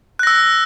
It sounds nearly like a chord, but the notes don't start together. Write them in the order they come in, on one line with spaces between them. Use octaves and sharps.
F#6 A#6 E6